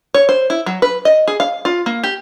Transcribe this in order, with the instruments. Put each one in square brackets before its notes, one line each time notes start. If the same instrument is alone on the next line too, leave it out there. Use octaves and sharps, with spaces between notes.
[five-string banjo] C#5
C5
E4
F#3
B4
D#5
G#4
F5
F4
A#3
G4